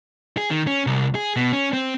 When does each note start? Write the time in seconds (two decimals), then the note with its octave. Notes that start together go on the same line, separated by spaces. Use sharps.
0.37 G#4
0.51 D#3
0.67 C#4
0.87 C2
1.15 G#4
1.36 B2
1.52 C#4
1.73 C4